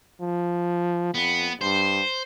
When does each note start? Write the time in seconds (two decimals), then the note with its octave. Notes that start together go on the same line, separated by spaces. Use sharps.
0.22 F3
1.14 F2 B3
1.61 G2 C5